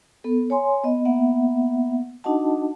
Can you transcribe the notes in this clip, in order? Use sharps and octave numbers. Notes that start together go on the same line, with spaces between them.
B3 A4
C#5 G#5 C6
B3 D#5
A#3 B3 E5 F#5
D4 D#4 F#4 D#5 F#5 A5